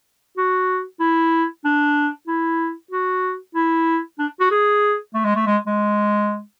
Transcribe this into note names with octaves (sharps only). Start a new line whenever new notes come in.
F#4
E4
D4
E4
F#4
E4
D4
F#4
G#4
A3
G#3
A3
G#3
G#3